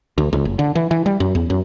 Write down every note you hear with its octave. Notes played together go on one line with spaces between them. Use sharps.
D2
C#2
F#1
D3
E3
E3
G3
F#2
E2
F#2